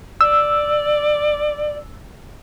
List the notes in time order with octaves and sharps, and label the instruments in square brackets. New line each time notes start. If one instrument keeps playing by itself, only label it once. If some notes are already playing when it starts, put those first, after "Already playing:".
[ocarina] D5 [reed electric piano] E6